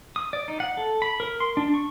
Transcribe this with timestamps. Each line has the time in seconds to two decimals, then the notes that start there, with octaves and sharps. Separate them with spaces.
0.16 D#6
0.33 D5
0.48 D#4
0.60 F#5
0.77 A4
1.02 B5
1.20 A#4
1.40 C6
1.57 D4
1.74 C#6